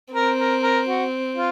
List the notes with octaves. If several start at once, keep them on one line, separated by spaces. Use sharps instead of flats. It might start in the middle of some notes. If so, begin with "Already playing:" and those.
C4 A#4
A#4
A#4
F#4
F4